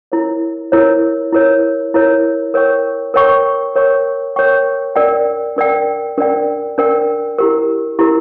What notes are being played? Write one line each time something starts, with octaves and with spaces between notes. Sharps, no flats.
E4 A#4 C#5
E4 A#4 C#5
E4 A#4 C#5
E4 A#4 C#5
A#4 C#5 G5 C#6
A#4 C#5 G5 C#6
A#4 C#5 G5 C#6
A#4 C#5 G5 C#6
D4 A#4 D5 G5
D4 A#4 D5 G5
D4 A#4 D5 G5
D4 A#4 D5 G5
E4 G4 A#4
E4 G4 A#4